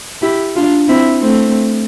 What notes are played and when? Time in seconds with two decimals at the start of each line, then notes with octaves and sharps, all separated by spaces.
0.22 E4 G4
0.56 D4 F4
0.88 C4 E4
1.22 A3 C4